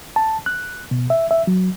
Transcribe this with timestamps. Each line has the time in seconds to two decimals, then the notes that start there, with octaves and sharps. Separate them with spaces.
0.16 A5
0.46 F#6
0.91 B2
1.10 E5
1.31 E5
1.47 F#3